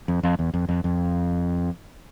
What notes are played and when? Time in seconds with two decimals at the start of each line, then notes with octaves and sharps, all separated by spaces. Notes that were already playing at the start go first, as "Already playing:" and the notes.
0.08 F2
0.23 F2
0.39 E2
0.54 F2
0.69 F2
0.84 F2